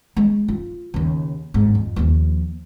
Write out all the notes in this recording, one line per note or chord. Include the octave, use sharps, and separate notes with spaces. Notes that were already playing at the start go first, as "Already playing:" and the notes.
G#3
F4
D#2 C#3
G#1 G#2
F2
D#2 F3